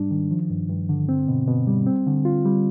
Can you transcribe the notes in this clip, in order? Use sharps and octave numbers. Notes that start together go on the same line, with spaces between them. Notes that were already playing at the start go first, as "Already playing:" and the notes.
Already playing: G#2 G3 D4
D#3
F3
G2
G2
D3
C4
B2
B2
G3
C4
D3
F4
G3